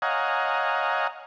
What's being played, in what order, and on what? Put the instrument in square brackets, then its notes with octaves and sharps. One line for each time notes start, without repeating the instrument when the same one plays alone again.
[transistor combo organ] C#5 D#5 F5 F#5 G#5 A#5